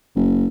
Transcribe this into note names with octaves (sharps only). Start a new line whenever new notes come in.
F#1